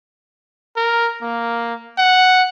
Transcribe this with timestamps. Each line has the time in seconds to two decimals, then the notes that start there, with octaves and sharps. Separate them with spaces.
0.77 A#4
1.22 A#3
1.98 F#5